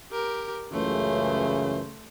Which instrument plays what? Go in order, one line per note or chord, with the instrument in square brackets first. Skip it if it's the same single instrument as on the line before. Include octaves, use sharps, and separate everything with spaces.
[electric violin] G4 A#4
[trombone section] C#2 F#2 E3 [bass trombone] C#3 [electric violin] A3 C5